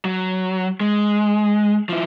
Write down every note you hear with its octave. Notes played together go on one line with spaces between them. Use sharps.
F#3
G#3
F3 E4